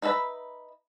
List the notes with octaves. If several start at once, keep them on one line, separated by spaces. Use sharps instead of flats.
D#4 B4 E5 A5 B5